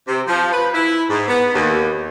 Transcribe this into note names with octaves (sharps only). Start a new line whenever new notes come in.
C3
F3
B4
E4
G#2
B3
D#2